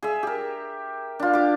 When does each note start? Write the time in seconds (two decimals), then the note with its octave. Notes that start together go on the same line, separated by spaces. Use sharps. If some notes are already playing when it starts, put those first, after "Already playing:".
0.03 G#4 E5
0.23 G4 A#4
1.19 D4 F4
1.34 G4 D6